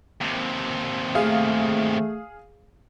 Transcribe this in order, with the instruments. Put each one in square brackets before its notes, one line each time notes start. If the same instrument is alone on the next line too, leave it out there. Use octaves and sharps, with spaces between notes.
[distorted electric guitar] D#2 C3
[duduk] A3 [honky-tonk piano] G#4 F5